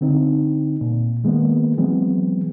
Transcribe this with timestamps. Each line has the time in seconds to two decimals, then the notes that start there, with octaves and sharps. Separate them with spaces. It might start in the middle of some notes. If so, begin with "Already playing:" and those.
0.01 D3 C4 D#4
0.81 A#2
1.24 D#3 G#3 A#3 B3
1.78 E3 F#3 G#3 B3 C4